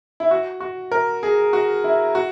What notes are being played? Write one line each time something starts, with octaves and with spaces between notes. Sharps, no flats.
E4
F#4
F#4
A#4
G#4
F#4
E4
F#4